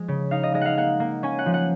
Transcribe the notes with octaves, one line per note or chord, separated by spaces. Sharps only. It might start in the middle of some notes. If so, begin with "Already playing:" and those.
Already playing: F3 G#3
C#3
D#4 F5
D#5
G#3 D#5
F5 F#5
A#3 F#5
A#3
C#4 G#5
F#5
F3
F#5